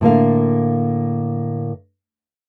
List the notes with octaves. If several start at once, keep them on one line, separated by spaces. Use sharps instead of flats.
A2 D3 A#3 F5